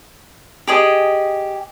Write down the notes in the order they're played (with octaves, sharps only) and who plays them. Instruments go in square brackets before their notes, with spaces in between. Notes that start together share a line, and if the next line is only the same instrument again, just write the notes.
[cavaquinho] G4 G#4 D#5